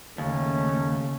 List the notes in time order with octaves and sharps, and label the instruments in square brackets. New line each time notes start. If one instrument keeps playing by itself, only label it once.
[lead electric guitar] D#2 [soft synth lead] C#3 [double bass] A3 [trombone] C#4